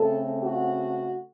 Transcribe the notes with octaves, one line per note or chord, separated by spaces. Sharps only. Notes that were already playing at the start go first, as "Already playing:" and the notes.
Already playing: C#3 A3 C4 A4
F#4